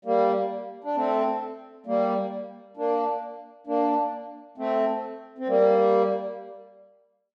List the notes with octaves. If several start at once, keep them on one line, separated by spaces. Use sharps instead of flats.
G3 A#3
D4
A3 C4
G3 A#3
A#3 D4
A#3 D4
A3 C4
C4
G3 A#3